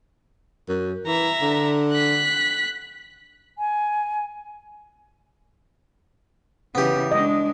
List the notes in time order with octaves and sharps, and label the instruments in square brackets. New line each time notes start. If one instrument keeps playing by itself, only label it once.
[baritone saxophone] F#2
[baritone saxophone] E3 [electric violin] E5 A#5
[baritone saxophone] D3
[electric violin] F#6 B6
[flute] G#5
[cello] C#3 E3 [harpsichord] B3 G4
[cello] G#3 D4 [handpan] D#5